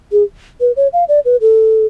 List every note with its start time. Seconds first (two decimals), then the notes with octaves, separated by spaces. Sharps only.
0.12 G#4
0.61 B4
0.76 C#5
0.93 F5
1.08 D5
1.25 B4
1.41 A4